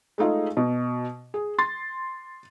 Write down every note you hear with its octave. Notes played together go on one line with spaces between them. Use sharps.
G#3 A3 D#4 F4 G#4
B2
G#4
C6 A6